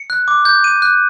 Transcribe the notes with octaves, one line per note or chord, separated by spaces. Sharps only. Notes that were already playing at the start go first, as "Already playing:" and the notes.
Already playing: C#7
F#6
D6
G6
D#7
F#6